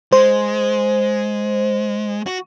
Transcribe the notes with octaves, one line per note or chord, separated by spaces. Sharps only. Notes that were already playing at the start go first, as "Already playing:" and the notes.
G#3 C5
F#4